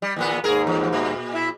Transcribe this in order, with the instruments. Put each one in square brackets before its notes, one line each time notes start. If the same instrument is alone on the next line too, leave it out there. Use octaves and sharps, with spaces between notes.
[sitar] G3
D#2 A#2 B3
[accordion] D#2 G#2 [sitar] G#4 A#4
[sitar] E2
A#2
[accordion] E4 E5